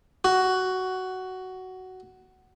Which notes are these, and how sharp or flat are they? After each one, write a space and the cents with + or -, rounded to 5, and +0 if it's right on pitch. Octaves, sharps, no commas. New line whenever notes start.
F#4 +10